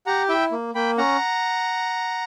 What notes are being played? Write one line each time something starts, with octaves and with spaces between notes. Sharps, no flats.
G4 F#5 A#5
E4 E5 G5
A#3
A#3 G5 B5
C#4 F#5 A#5